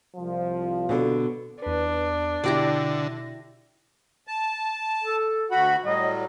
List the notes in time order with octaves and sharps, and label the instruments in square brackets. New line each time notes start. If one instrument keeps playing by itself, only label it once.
[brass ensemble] C2 F3
[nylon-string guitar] B2 D3
[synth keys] E2 B4 [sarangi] D4
[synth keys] B2 A#6 [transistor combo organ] D3 [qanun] E4 G4 D5
[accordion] A5
[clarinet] A4
[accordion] D2 F#4 B5 [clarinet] F#5
[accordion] A2 F#3 G3 [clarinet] D#5